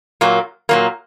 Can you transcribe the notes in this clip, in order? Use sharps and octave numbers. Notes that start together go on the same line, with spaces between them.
A#2 F#3 A#3
A#2 F#3 A#3